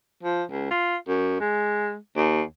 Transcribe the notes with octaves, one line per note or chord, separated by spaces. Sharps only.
F3
C#2
F4
F#2
G#3
D#2